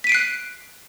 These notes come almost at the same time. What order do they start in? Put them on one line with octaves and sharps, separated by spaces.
B6 D#7 D7 C7 F#6